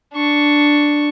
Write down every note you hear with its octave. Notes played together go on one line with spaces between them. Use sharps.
D4 C#6